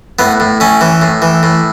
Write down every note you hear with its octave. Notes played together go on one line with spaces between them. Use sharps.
A2 B3
A2
A2 C#4
E3
A2
E3
A2